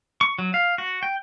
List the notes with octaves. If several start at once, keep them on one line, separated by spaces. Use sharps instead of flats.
C#6
F#3
F5
F#4
G5